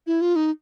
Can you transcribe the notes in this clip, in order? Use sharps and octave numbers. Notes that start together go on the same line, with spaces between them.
E4
F4
D#4